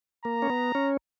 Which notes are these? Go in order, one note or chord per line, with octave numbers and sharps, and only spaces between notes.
A#3 A#5
C#4
B3
C#4